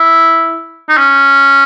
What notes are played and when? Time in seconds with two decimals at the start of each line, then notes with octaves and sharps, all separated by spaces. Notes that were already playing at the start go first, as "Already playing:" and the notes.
Already playing: E4
0.89 D#4
0.97 C#4